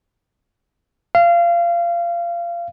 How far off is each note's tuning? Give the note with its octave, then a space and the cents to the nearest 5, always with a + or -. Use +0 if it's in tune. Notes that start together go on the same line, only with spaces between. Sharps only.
F5 -25